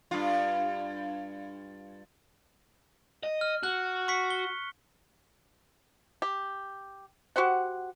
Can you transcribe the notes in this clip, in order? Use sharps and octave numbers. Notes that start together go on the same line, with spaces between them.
G2 F4
D#5
F6
F#4 F#6
C#6 B6 C#7
G7
G4
F#4 G4 C5 F#5